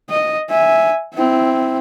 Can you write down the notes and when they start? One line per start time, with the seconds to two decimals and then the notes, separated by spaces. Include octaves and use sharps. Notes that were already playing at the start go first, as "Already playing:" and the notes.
0.10 D#5
0.50 E5 G#5
1.15 C4 E4